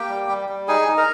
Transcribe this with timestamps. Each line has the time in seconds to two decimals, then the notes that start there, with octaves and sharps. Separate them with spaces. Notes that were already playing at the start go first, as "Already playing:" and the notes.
Already playing: A#3 G4 G5
0.09 G3
0.29 G3
0.49 G3
0.68 D#4 G#4 G#5
0.88 D#4
0.97 A#4 A#5